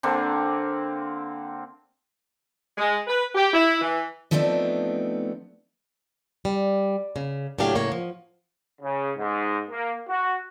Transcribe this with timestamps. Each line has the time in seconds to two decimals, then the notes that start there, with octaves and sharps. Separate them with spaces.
0.03 D3 A#3 C4 D4
2.78 G#3
3.07 B4
3.35 G4
3.53 E4
3.81 E3
4.31 F3 A3 B3 C4 D4 D#4
6.45 G3
7.16 C#3
7.59 A2 C#3 F#3 D4 G4 F5
7.75 A2 C#3 A#3 C#5
7.92 F3
8.81 C#3
9.17 G#2
9.70 A#3
10.08 F#4